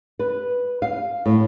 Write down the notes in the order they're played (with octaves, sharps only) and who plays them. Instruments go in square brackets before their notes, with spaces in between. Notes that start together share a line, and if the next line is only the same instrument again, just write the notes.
[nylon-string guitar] B4
F5
A2